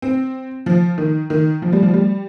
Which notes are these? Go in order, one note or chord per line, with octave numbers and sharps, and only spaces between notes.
C4
F3
D#3
D#3
F3
G3
F3
G3